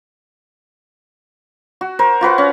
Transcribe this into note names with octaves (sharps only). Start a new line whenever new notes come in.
F#4
A#4 C5
F4 F#4 B4 C5
C#4